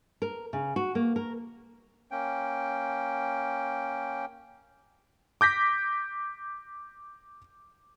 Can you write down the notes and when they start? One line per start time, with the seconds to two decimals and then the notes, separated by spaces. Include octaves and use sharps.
0.22 A#4
0.53 C#3
0.76 F#4
0.95 A#3
1.16 A#4
2.11 A#3 C#4 G5
5.41 D6 G6 A#6 B6